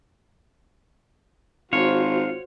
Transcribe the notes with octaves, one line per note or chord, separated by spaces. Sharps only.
G#1 F4 F#4 C5 C#5